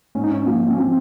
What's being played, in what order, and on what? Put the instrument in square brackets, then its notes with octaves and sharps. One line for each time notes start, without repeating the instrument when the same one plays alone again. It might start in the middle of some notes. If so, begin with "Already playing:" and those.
[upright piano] G#2 [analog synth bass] C#4
[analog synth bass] D#4
C#4
[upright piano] F3 [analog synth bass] A#3
[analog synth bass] C#4
[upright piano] F3 [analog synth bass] C4